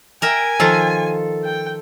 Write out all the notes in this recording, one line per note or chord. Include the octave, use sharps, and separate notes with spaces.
A#4 E5 G5 G#5
D#3 F3 F4 A4
G5